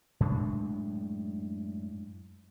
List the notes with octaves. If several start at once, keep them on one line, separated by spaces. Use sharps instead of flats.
F#2 A2 G#3 D4